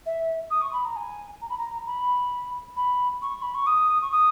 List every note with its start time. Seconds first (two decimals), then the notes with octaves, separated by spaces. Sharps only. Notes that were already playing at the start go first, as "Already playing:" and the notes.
0.06 E5
0.50 D#6
0.62 C#6
0.73 B5
0.85 A#5
0.96 G#5
1.42 A#5
1.50 B5
1.58 A#5
1.86 B5
2.76 B5
3.22 C#6
3.42 B5
3.55 C#6
3.67 D#6
4.02 C#6
4.12 D#6